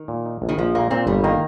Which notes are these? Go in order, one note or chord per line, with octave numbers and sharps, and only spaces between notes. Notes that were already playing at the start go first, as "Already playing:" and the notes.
Already playing: D#3
A#2
D#4
A#1
D#3
A#1 F3
A#2 A#3
A#2 C4
G1 G3
D#3 A#3